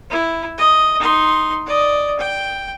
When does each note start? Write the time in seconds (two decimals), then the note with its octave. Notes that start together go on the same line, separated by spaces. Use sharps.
0.11 E4
0.58 D#5
0.99 D#4 C6
1.66 D5 D#5
2.19 G5